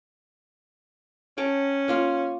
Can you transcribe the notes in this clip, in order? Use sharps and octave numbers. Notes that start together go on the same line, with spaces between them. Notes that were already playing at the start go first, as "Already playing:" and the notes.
C#4 G5 A5 A#5
A#3 F4 F5